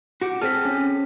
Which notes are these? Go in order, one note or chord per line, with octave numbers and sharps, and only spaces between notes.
F#4 G4
C4 G#4 A4 F6 B6
C#4